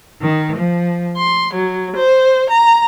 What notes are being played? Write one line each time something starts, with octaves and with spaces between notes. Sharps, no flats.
D#3
F3
C6
F#3
C5
A#5